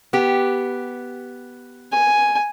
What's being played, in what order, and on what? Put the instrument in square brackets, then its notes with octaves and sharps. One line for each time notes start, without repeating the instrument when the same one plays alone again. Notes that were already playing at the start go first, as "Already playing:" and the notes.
[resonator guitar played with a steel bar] B3 G4
[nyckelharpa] G#5